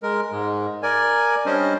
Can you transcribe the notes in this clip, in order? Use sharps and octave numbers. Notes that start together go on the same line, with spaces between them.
G#3 A#4
G#2 G#3
A#4 D5 G#5
G3 C#4 D4 C5 D#5